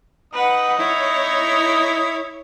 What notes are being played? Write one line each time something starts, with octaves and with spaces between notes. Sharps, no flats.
D#4 B4 F#5 D#6
E4 C#5